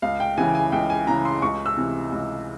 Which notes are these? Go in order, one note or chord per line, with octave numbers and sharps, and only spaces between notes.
C#2 F5
G5
C#3 E3 G#5
G#5
C#2 G5
G#5
C#3 E3 A#5
C6
C#2 C#6
E6
C3 E3
C#2